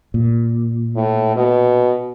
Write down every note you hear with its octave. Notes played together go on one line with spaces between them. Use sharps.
A#2
A2
B2